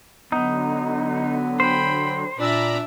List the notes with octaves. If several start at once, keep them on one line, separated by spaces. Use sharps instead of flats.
D3 F#3 B3 D#4
C5 G5 B5
A#2 D4 D5 E5 A#5 B5